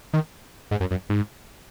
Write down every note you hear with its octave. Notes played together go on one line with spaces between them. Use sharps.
D#3
G#2
F#2
F#2
G#2